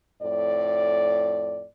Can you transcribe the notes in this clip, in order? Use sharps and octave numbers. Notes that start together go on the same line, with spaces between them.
F2 A2 D5